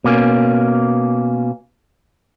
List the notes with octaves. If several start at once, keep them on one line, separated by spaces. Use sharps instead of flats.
B2 A#3 C#4